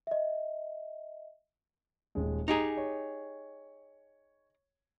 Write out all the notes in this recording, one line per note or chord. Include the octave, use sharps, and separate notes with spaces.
D#5 E5
D#1 G#3
D#4 G4 G#4 D#5 G#5 A#5
C#5